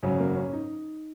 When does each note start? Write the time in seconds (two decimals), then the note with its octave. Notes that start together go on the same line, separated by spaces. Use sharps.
0.03 G#1 F#2 C#3 F#3 C#4
0.20 A#3
0.36 C#4
0.53 D#4